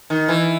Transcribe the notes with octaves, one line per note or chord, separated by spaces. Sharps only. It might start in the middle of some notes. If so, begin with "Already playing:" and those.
D#3
E3